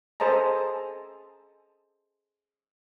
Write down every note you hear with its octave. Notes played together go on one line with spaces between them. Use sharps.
G#4 A4 C5 D#5 A5 A#5